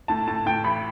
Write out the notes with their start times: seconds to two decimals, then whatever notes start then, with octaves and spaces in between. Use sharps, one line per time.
0.08 A2 A5
0.27 A2 A5
0.46 A2 G5
0.64 A1 B5